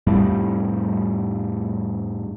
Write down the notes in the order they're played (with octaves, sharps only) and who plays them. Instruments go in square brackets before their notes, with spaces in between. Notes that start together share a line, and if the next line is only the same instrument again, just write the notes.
[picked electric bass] F2 A2 G3